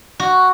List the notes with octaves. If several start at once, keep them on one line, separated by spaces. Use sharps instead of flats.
F#4